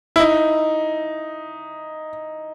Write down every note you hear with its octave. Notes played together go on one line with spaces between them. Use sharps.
E4
D#4